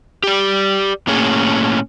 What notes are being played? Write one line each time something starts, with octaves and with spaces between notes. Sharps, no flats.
G4 D5
A2 A#3 C#4 G#4